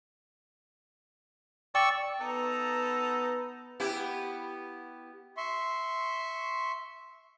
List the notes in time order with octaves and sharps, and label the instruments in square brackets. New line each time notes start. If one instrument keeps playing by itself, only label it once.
[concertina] D5 C#6 E6 [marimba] G5
[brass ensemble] B3 B4 [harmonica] D#4 A4 A#5
[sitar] B3 E4 G4
[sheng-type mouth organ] E5 C6 C#6